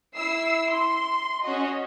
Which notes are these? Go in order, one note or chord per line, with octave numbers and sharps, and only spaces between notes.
E4 E6 C7
C6
C#4 F#4 D#5